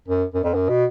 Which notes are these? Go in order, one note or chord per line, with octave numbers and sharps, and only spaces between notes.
F#2
F#2
F2
F#2
B2